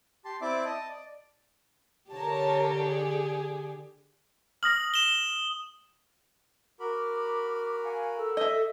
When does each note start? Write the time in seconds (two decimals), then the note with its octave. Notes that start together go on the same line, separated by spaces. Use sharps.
0.25 G4 A5 C6
0.41 C4 E4 D5 E5 D6
0.65 D#5 A5
0.89 D5
2.11 D3 G4 A#4 C#5 A5
2.82 G#4
4.63 D#6 F6 A#6 F#7
4.94 E7 G7
6.80 F#4 A#4 B5 D6
7.83 F5 F#5 G#5
8.17 A4 E6
8.37 D#5 E5